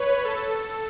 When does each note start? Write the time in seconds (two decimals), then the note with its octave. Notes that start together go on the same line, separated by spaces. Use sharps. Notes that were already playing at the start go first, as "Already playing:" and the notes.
Already playing: B4 C#5
0.25 A4